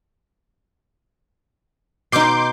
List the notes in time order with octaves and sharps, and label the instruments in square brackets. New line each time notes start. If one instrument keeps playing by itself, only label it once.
[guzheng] B2 D#4 [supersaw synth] C6 D6 G6